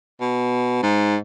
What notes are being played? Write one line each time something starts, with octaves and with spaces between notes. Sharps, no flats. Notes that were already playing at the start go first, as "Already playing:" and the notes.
B2
G#2